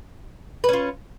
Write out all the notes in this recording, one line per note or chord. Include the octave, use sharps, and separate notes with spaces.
C#4 F4 B4